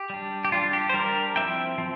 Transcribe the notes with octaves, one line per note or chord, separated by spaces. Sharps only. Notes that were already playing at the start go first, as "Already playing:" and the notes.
Already playing: G4
G3 D4
G4
G3 D4 F4
G4
C5
G3 D4 G4 A#4
F3 C4 E4 E5 G5
F3 C4